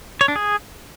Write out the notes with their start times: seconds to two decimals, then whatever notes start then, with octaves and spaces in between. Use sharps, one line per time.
0.21 C#5
0.28 D4
0.36 G#4